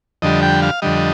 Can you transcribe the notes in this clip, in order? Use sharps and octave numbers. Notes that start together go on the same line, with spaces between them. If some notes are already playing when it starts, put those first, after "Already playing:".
F2 D3 G3 D#5
G5
F5
F2 D3 G3 D#5